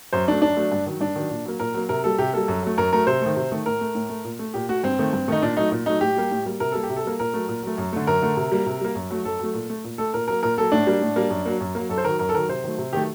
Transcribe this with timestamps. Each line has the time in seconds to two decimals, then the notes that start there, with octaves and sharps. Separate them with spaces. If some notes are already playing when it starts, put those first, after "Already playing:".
0.13 F#2 C5
0.27 F#3 A3 D4
0.42 F#2 D4
0.57 F#3 A3
0.72 G2
0.86 D#3 F#3
1.01 G2 D4
1.16 D#3 F#3
1.30 A#2
1.45 F#3 A#3
1.59 A#2 A#4
1.74 F#3 A#3
1.89 C3 A#4
2.04 G3 A#3 A4
2.18 C3 G4
2.33 G3 A#3 A4
2.48 F#2
2.63 F#3 A3
2.78 F#2 A#4
2.93 F#3 A3 A#4
3.07 C3 C5
3.22 D#3 A3
3.37 C3
3.52 D#3 A3
3.66 A2 A#4
3.81 A3
3.95 A2
4.10 A3
4.25 A#2
4.39 A3
4.54 A#2 G4
4.69 A3 F#4
4.84 G2 C4
4.99 D#3 A3
5.13 G2
5.28 D#3 A3 D#4
5.42 A#2 D4
5.57 F#3 A3 D#4
5.72 A#2
5.86 F#3 A3 D#4
6.01 A2 G4
6.16 G3 A#3
6.31 A2
6.45 G3 A#3
6.60 C3 A#4
6.72 G3 A#3 A4
6.83 G4
6.90 C3
6.96 A4
7.04 G3 A#3
7.20 A#2 A#4
7.34 F#3 A3
7.48 A#2
7.63 F#3 A3
7.78 F#2
7.93 D3 A3
8.07 F#2 A#4
8.22 D3 A3
8.37 C3
8.52 G3 A#3
8.66 C3
8.81 G3 A#3
8.95 F#2
9.10 F#3 A3
9.25 F#2 A4
9.40 F#3 A3
9.54 A#2
9.70 A3
9.84 A#2
9.98 A3 A4
10.14 A#2 A#4
10.28 F#3 A#3 A#4
10.43 A#2 A#4
10.58 F#3 A#3 A4
10.72 A2 D4
10.87 G3 A#3
11.01 A2
11.16 G3 A#3
11.31 F#2
11.46 F#3 A#3
11.61 F#2
11.75 F#3 A#3
11.90 F#2 A4
11.98 C5
12.04 D#3 F#3 A#4
12.19 F#2 A#4
12.29 A4
12.34 D#3 F#3 A#4
12.49 C3 C5
12.64 D#3 F#3 A3
12.78 C3
12.93 D#3 F#3 A3 G4